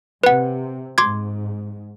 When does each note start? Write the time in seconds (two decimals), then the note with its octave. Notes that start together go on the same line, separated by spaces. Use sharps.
0.23 C3 B4 F#5
0.98 G#2 C6 D6 G#6